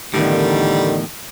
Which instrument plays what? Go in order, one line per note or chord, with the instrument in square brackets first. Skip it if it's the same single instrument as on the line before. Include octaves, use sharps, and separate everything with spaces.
[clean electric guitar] E2 A2 [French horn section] D3 D#3 [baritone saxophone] G3